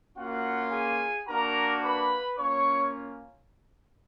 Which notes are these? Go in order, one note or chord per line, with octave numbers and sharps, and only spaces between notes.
A#3 C#4 F4 F#4 F#5
G#4 G#5
A#3 D4 F#4 A#4 A#5
B4 B5
A#3 C#4 F4 C#5 C#6